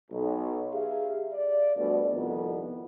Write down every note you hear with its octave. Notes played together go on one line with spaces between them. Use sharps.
B1
G4 G#4 E5 F5
D5
D2 G2 B2
C2 F2 B2 D#3 B3